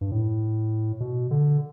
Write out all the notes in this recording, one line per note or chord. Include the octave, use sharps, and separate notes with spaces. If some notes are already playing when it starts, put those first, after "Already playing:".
G2
A2
B2
D3